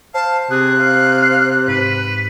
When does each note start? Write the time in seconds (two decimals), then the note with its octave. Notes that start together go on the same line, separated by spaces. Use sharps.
0.14 C5 F5 A5
0.50 C3 G#4 F#6
0.79 F5
1.68 G#2 B4